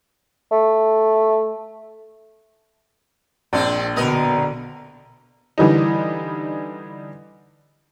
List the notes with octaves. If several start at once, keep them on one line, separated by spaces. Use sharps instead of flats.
A3
A#1 G#3 C4 D4
B2 D3 A#4 B4 D#5
D3 E3 G3 D#4